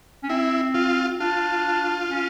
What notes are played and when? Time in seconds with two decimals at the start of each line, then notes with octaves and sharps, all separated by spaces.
0.24 C#4
0.29 C4 E4
0.75 F4
1.20 D4 F4
2.11 C#4